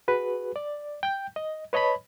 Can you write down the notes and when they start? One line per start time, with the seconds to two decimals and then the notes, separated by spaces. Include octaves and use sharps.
0.08 F#4 G#4 B4
0.56 D5
1.03 G5 G6
1.36 D#5
1.73 B4 C#5 D#5 A5 B5